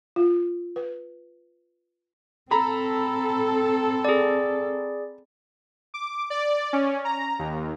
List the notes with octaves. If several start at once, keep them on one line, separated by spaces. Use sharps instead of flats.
F4
B4
C4 A4 A#5 B5
G#4 D5
D6
D5
C#4
A#5
D#2